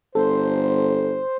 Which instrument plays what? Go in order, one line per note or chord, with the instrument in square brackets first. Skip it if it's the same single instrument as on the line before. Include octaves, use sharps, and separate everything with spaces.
[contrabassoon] G1 [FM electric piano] A4 [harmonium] C5